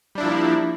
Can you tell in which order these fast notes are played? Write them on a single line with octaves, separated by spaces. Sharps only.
G3 D4 E4 F3 A#3